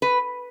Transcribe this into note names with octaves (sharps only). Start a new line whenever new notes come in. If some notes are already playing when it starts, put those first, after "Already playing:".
B4